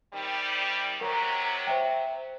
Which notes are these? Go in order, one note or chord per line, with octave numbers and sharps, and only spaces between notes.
C3 D#3 G3
C3 F#3 A#4 A#5
C5 E5 G5